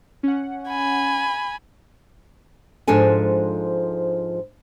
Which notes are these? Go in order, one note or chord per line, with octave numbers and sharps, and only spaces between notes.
C#4 F#5
G#5 B5
G#2 F3 G#3 D4 A4 G#5